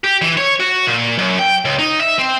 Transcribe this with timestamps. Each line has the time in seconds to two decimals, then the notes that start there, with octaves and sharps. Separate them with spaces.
0.04 G4
0.22 E3
0.37 C#5
0.60 F#4
0.88 A#2
1.19 F#2
1.39 G5
1.65 C#2
1.79 D#4
2.00 E5
2.19 C4